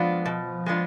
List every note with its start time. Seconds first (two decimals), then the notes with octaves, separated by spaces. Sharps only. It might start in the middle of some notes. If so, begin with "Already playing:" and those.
Already playing: F3 G#3 B3 D4 F4
0.25 B2
0.66 G#3 B3 D4 F4